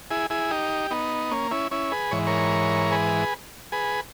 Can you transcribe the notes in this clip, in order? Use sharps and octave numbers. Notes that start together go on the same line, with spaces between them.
E4 G#4
E4 G#4
D#4 G4
B3 D#4
A#3 C#4
C#4 E4
C#4 E4
G#4 B4
G#2 E3 C#5
A#4 C#5
G#4 B4
G#4 B4